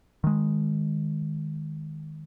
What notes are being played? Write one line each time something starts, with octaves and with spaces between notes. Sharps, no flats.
D#3 G#3